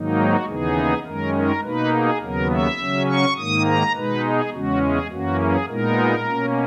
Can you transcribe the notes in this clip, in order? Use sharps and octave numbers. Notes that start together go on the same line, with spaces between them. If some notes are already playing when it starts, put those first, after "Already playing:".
Already playing: G#2 D#3 F#3 A#3 D#4
F#4
D#2 C#3 E3 B3 D#4 G#4
F#2 D#3 G#3 C#4 A#4
A#4
B2 A#3 D#4 B4
G#4
D#2 C#3 F#3 B3 A#4
E5
C#3 F#3 C#4
C#6
G#2 D#3 A#3 D#6
A#5
B2 G#3 D#4 B4
G#4
E2 C#3 G#3 C#4 F#4
G#4
F#2 E3 A#3 C#4 F#4
G#4
A#2 G#3 B3 D#4 A#4
B2 A#3 C#4